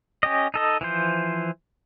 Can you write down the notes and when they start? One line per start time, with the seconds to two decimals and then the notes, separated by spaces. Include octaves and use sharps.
0.23 C#4 G4 D#5
0.54 D#4 A4 D#5
0.81 E3 F3 C5